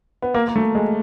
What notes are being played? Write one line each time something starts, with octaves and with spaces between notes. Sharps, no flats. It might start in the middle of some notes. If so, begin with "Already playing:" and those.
B3
A#3
A#3
A3
G#3